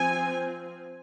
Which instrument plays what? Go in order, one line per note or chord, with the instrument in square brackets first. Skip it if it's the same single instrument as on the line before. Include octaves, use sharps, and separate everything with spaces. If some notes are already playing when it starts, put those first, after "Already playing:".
Already playing: [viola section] F3 C4 G#5